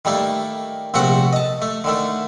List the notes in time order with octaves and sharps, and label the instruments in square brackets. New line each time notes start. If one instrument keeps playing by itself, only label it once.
[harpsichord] D#3 G3 A3 A#3
A#1 C3 A3 F#4 F#5
D#5 A5
A3
D3 D#3 A3